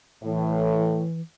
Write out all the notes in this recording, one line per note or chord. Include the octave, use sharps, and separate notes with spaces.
A2 E3